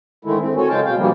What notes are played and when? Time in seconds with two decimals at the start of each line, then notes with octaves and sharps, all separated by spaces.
0.25 G#2 D3 D#3 G#3 A3 E4
0.40 C4
0.57 F#4 A4 C#5 G#5
0.69 C#3 F#3 G#3 F5 G5 A5
0.85 B2 F5 G5
0.97 B2 D3 E3 F3 G3 A#3